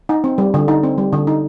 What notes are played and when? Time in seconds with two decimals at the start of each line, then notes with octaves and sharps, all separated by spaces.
0.09 D#4
0.24 C4
0.38 G3
0.54 D3
0.68 D#4
0.83 C4
0.98 G3
1.13 D3
1.27 D#4